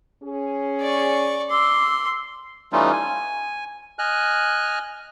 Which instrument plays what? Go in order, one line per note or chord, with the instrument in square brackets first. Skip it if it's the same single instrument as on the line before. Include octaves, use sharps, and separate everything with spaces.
[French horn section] C#4 G#4
[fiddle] D5 C#6
[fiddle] C6 [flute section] D6 E6
[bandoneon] E3 G3 A3 C#4 D#4 F4
G#5
D#5 G#5 F6 F#6